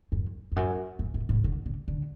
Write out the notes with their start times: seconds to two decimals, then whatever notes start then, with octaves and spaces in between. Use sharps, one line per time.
0.12 F#2
0.52 F2
0.56 F#2
0.99 F#2
1.14 G2
1.29 G#2
1.44 D3
1.66 D3
1.88 D3